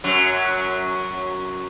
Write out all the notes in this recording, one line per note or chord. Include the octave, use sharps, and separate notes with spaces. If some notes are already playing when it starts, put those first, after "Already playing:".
F#2 F#3